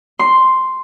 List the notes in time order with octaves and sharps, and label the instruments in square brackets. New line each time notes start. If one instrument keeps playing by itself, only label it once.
[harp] C6